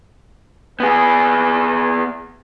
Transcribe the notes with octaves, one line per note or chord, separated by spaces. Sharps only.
B3 G#4 B4